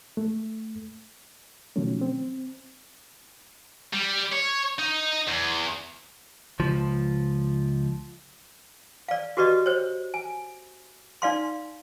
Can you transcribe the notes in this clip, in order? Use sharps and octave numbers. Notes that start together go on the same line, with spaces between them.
A3
B2 D#3 F3 F#3 A3 C#4
C4
G3
C#5
D#4
E2
C#2 F3
D5 F5
F#4 G4 B4 D5 D#5
C5 C#5
G#5
D#4 D5 F5 C6